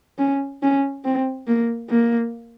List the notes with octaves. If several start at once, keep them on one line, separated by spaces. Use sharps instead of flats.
C#4
C#4
C4
A#3
A#3